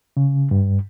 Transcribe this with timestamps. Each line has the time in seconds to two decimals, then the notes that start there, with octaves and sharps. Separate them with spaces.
0.17 C#3
0.51 G2